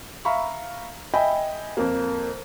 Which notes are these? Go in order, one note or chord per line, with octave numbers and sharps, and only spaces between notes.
E5 F5 A#5 B5 C#6
D#5 E5 G5 G#5 B5
F2 A#3